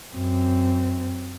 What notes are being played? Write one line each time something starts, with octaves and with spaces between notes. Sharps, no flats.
F#2 C4